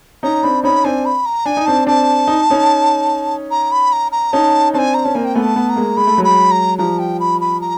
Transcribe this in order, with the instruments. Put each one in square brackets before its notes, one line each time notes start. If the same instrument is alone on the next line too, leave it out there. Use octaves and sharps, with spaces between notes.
[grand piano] C#4 D#4 [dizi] A#5
[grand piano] C4 D4 [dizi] B5
[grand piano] C#4 D#4 [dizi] B5
[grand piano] C4 D4 [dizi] G#5
[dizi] B5
A#5
[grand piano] D4 [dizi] G#5
[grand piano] D#4
[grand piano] C4 D4 [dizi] A5
[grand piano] C4 D4 [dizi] A5
[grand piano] D#4
C#4 D#4
[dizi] A#5
B5
A#5
A#5
[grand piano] C#4 D#4 [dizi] A5
[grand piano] C4 D4 [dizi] G#5 A5
[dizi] A#5
[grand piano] C#4 [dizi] A5
[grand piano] A#3 C4 [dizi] G#5
[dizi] G5
[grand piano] A3 B3 [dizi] G#5
[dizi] A5
[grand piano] A3 B3
[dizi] A#5
[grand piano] G#3 A#3
[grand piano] G#3 [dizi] B5
[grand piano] A3
F#3 G#3
[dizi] B5
A#5
[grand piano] F3 G3 [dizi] A#5
[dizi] G5
B5
B5
A#5